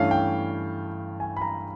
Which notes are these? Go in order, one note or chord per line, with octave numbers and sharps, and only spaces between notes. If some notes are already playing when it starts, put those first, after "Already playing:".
Already playing: G2 E3 A3 C#4 F5
G5
G#5
B5
A#5